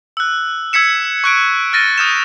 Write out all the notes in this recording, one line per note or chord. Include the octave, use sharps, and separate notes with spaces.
E6 F#6
E6 G#6 B6 C#7 E7
C#6 F#6 D7
F6 A6 A#6 D#7
D#6 F6 G6 E7